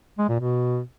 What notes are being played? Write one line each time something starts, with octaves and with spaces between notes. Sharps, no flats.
G#3
A#2
B2